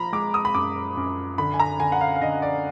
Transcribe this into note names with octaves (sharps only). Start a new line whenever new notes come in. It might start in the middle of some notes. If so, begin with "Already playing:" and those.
Already playing: F3 A#5 B5
G#3 D6
D#6
B5
F#2 D6
F#2
D3 B5
G#5
A#5
D3 G#5
F#5
F5
F5
D3 D#5
D5